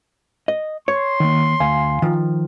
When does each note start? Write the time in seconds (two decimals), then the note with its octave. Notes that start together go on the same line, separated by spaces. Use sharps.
0.48 D#5
0.88 C#5 C6
1.20 D#3 A#3
1.60 D2 F5 G#5
2.02 D#3 F3